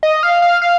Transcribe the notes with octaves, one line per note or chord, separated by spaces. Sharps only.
D#5
F5
F5
F5